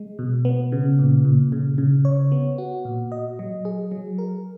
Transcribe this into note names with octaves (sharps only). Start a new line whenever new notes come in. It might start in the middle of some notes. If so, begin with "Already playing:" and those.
Already playing: G#3
B2
B3
C#3
A#2
A#2
C#3
C#3
C#5
B3
F#4
A#2
D#5
F#3
G#4
F#3
A#4